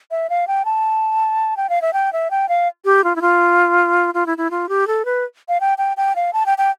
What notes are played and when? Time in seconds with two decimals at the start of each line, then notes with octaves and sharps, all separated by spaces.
0.11 E5
0.30 F5
0.48 G5
0.65 A5
1.57 G5
1.70 F5
1.82 E5
1.93 G5
2.13 E5
2.31 G5
2.49 F5
2.85 G4
3.04 F4
3.16 E4
3.21 F4
4.14 F4
4.26 E4
4.38 E4
4.51 F4
4.69 G4
4.87 A4
5.05 B4
5.49 F5
5.61 G5
5.78 G5
5.97 G5
6.16 F5
6.33 A5
6.46 G5
6.58 G5